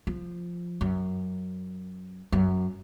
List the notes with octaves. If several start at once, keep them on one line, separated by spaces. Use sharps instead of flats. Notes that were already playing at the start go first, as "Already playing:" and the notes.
F3
F#2
F#2